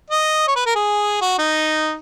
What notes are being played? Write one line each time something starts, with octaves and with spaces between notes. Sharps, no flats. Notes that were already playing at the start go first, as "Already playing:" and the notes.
D#5
C#5
B4
A#4
G#4
F#4
D#4